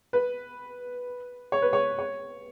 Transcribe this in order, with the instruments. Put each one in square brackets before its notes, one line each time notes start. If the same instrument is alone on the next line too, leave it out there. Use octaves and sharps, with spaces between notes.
[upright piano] B4
C#5
B4
C#5
C#5